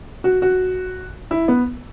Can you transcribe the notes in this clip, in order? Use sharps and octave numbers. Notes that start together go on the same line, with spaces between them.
F#4
F#4
E4
B3